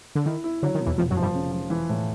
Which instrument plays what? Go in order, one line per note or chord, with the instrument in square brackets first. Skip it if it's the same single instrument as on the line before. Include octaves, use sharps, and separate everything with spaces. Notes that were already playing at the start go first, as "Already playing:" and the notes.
[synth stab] D3
[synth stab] D#3 [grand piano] E4
[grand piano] E4
[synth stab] D3 [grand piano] F#3
[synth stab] D#3
[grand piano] B2
[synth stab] E2 E3
[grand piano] F1 [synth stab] F2 F3
[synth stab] F#2 F#3
[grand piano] F3
[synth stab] G2 G3
[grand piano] C#3
F3
E3
A2